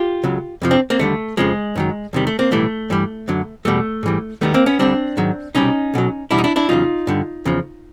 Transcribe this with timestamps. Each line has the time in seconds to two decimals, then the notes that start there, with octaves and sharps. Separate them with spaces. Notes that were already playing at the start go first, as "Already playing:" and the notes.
Already playing: F4 G4
0.24 C#2 C#3 F#3
0.62 F2 C3 F3
0.71 C4 D4
0.90 A#3 C4
0.99 D#2 D3 G3 A3
1.37 F2 C#3 F3 G#3
1.76 F#2 D#3 F#3
2.13 E2 C3 D#3 G3
2.27 A3
2.39 A#3 C4
2.51 B1 A2 E3 G3 A3
2.90 G2 E3 G3
3.28 F#2 D3 F#3
3.65 E2 B2 G3 A3
4.03 G#2 E3 G3
4.41 D#2 D#3 G3 A3 B3
4.54 A#3 C4
4.66 B3 C#4
4.79 D2 D3 G3 C4 D4
5.17 G#2 D#3 F#3
5.55 C2 B2 G3 C#4 D#4
5.94 B1 B2 F#3
6.31 E2 B2 G3 D4 E4
6.38 D#4
6.44 D4 E4
6.56 D4 E4
6.69 E2 C#3 F#3 D#4 F4
7.07 G2 D3 G3
7.45 E2 C#3 F3